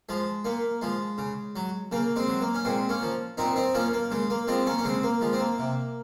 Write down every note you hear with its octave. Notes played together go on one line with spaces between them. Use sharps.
F3 G#3
A#2 A#3
F3 G#3
C#3
F#3
C#3 A#3
G#3 C4
F#3
A#3
C#4
A#2 G#3 C4
A#3 C#4
F3
A#2 C4 D#4
C4 D#4
F3 A#3 C#4
A#3
C#3 G#3
A#3
F3 G#3 C4
A#3 C#4
C#4
C#3 G#3 C4
A#3
F3 G#3
C4
A#3
C3